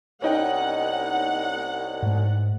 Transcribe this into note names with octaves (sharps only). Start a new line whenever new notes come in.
C2 C#4 D#4 F#5 G5
G#2 A3